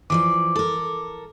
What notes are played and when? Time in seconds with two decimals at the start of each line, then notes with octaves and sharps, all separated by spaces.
0.10 E3 F3 D5 D6
0.56 A4 A#4